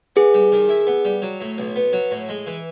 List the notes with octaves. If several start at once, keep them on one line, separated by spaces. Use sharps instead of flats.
B3 G#4
G3
D#3
E4
B3
G3
F#3
A2
B1
B3
F#3
A2
G#3
E3